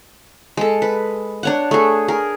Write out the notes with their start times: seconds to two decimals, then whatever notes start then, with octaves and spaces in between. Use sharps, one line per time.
0.57 G#3 A4
0.82 B4
1.43 D4 C#5 F#5
1.71 A3 G#4
2.08 G#4 A#4